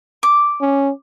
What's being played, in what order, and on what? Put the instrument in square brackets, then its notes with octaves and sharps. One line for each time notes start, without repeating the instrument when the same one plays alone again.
[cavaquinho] D6
[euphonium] C#4